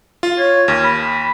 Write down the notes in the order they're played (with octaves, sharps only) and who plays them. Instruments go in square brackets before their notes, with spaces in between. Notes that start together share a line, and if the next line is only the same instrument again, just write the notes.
[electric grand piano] F4
[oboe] C#5
[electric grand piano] D#2 [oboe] C#4
[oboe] B5